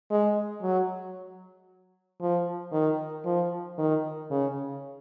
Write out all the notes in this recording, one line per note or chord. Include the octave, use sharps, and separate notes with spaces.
G#3
F#3
F3
D#3
F3
D#3
C#3